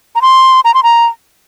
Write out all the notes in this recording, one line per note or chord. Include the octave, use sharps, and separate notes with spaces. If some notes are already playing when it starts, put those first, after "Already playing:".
A#5
C6
A#5
C6
A#5